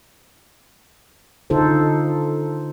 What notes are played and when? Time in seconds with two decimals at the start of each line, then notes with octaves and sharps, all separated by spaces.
1.50 D3 D#4 F4 A4 C5